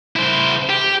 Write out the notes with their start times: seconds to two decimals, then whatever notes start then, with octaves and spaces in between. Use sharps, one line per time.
0.16 E4 C5
0.70 G4